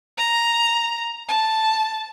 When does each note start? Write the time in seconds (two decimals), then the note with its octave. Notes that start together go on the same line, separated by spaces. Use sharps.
0.18 A#5
1.28 A5